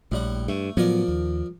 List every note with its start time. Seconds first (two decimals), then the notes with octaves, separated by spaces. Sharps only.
0.12 A#1 A2 G3 F#5
0.48 G2 A3
0.77 A2 F3 F#3 B3 A#4 D5
1.08 D#2